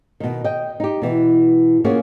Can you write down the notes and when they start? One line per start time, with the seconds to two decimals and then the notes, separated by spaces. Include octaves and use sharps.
0.20 B2 D#3
0.44 D#5 G5
0.80 D#4 G4
1.02 B2 E3
1.84 A#3 C#4 F4 F#4 G#4